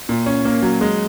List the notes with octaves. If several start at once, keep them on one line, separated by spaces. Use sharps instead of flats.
A#2
C#4
A#3
F#3
G#3